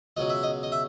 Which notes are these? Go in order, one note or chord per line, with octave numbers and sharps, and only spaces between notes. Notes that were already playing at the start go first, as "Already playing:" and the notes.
C#2 B2 F#3 D#5
E5
D#5
D#5
E5